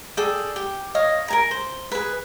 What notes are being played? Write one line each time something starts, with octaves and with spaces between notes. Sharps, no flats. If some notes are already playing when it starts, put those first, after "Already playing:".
G#4 A4 D5 G5
G4
C#5 D#5 F5
A#4 G#5 A#5
C5
G#4 B4